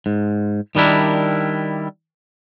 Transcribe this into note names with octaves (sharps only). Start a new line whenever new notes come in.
G#2
D#3 G3 D4 E4 A#4